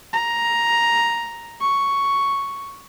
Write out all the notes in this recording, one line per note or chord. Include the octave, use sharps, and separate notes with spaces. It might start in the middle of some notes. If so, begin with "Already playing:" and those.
A#5
C#6